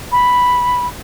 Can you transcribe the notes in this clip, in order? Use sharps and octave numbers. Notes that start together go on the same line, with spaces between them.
B5